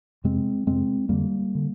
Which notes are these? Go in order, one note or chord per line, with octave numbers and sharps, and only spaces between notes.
F2 C3 G#3 C4
F2 C3 G#3 C4
F2 D3 G3 A#3
D3